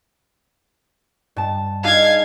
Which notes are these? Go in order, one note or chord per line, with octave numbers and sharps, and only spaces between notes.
G2 A5
D4 D#4 G#4 F5 G#6